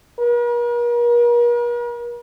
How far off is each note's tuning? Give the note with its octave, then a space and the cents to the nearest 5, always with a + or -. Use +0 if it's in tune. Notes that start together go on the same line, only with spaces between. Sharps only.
A#4 +45